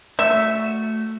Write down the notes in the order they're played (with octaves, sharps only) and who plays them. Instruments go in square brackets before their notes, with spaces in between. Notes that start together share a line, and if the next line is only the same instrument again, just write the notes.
[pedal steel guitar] A3 F#4 [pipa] E5